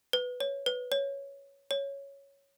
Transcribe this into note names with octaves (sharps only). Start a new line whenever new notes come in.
B4
C#5
B4
C#5
C#5